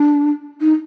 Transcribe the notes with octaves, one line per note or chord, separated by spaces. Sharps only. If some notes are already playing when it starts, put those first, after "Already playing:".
Already playing: D4
D#4